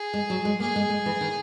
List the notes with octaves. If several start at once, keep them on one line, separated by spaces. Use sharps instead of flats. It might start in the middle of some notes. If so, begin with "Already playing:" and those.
Already playing: G#4
G#3
F#3
G#3
A#3 G#4
G#3
G#3
E3
D#3